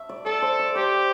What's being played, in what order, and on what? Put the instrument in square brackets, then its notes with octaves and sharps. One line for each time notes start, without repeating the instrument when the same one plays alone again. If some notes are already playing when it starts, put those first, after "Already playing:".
Already playing: [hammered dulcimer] E5
D5
[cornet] A4 [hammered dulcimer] D5
[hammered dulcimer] C5
D5
[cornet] G4 [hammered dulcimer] C5